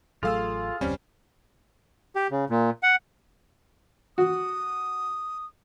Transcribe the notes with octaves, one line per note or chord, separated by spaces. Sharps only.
A1 F#3 A3 F4 G#4 A4 F5 E6
F#1 D#2 G3 C4 C#4 C5
G4
C#3
A#2
F#5
F#4 D#6